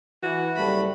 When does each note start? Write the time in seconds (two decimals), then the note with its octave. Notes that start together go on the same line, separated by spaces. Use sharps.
0.23 E3 F#4
0.56 F#1 G3 A3 B5